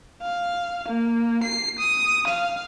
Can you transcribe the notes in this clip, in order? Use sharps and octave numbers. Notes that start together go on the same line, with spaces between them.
F5
A#3
C7
D#6
F5